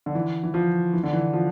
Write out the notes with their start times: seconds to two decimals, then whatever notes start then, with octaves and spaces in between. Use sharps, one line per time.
0.06 D3
0.15 E3
0.43 E3
0.54 F3
0.93 E3
1.03 D3
1.13 E3
1.33 F3